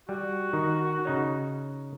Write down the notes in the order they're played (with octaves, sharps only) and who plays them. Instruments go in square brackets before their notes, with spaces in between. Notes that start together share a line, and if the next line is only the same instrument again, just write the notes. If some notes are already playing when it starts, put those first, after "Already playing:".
[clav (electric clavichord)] G3 [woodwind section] F#4
[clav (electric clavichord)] D#3 D#4
C#3 D#4 C#5